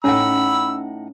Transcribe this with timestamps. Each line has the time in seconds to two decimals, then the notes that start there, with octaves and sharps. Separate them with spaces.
0.04 A2 C#4 D#4 C#5 F#5 G#5 B5 E6